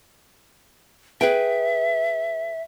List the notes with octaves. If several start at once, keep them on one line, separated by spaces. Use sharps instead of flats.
G#4 B4 E5 G5